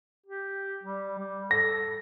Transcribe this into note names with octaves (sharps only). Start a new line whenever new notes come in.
G4
G3
G3
A4 A#6